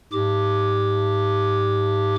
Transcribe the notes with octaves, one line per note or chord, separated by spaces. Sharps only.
G#2 G4 D6